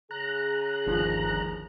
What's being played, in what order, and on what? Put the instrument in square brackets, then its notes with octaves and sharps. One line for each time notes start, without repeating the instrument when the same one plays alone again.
[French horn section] C#3 G#4 [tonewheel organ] A#5 F#6
[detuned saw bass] G1 [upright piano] D#2 F3